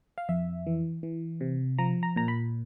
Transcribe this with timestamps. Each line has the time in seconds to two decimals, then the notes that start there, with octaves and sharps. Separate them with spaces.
0.18 F5
0.28 F2 E5
0.67 E3
1.03 E3
1.41 C3
1.79 F3 A#5
2.03 A#5
2.16 A#2 A#5
2.28 B5